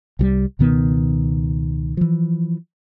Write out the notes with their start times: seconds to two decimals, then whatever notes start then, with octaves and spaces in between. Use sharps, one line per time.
0.19 C2 E3 G3
0.59 C#2 B2 D#3 B3
1.97 E3 F3